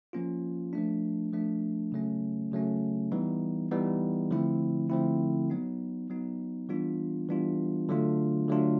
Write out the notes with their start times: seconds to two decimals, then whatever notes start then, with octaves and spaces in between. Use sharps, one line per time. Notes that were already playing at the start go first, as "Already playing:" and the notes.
0.13 F3 A#3 C#4 F4
0.73 F3 A3 D4
1.33 F3 A3 D4
1.92 C#3 F#3 A3 C#4
2.52 C#3 F#3 A3 C#4
3.12 E3 G3 B3 D#4
3.71 E3 G3 B3 D#4
4.31 D3 F3 A3 C4 E4
4.90 D3 F3 A3 C4 E4
5.50 F#3 B3 D#4
6.10 F#3 B3 D#4
6.69 E3 G3 B3 D4 F4
7.29 E3 G3 B3 D4 F4
7.89 D3 F#3 A3 D4 F4
8.48 D3 F#3 A3 D4 F4